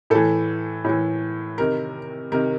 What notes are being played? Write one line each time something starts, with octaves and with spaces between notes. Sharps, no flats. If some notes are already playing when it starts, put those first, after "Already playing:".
A2 E3 A4
A2 E3
C3 D#3 A#4
C3 D#3 A#4